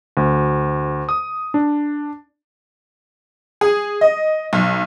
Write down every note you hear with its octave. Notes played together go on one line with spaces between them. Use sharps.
D2
D#6
D4
G#4
D#5
B1